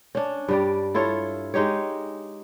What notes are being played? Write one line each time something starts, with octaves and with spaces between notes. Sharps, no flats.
C#4 D4
G2 G3 D5
E4 F4 A4 C#5
G#3 D#4 G4 C#5